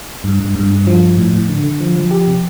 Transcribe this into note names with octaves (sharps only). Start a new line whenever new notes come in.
G2
G2
G2
G2
F3
F3
A2
A2
D3
D3
F3
F3
G4
C3